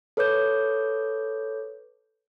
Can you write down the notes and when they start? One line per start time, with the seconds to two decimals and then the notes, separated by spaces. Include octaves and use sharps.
0.17 A4 B4 C#5 D6 G6